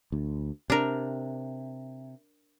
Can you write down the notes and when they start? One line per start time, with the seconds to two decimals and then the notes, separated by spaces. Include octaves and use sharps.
0.12 D2
0.70 C3 D4 A#4